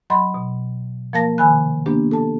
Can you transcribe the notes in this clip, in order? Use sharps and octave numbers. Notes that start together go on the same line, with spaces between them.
F#3 D#5 B5 C6
B2
F3 A#3 A#4 F5 A5 A#6
C3 D#3 G#5 B5 F#6
A#3 B3 D4 G4
A4 A5